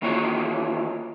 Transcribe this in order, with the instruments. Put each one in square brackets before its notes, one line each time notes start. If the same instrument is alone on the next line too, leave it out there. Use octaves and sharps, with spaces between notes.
[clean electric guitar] D#3 E3 A#3 F4 F#4 C#5